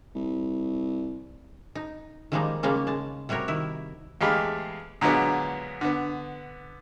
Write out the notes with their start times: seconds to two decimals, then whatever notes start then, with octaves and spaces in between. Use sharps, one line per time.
0.15 C2
1.75 D#4
2.32 D#3 F3 G3 G#3 A#3 D#4
2.63 C#3 G3 G#3 A#3 C#4
2.87 G#3 A5
3.29 C3 G3 F#4 A#4 C#5
3.48 D#3 E4
4.21 E2 G#3 A3 G4 F5 B5
5.01 A#2 D3 F#3 G#3 B3
5.81 D3 B3